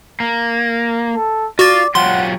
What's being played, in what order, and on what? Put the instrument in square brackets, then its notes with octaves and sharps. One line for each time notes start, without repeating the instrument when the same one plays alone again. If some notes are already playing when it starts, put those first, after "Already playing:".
[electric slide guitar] A#3
[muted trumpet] A4
[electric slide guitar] F4 [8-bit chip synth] F#4 A6 [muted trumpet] D5
[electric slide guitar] F#3 F4 G4 [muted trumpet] F#5 [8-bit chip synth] C6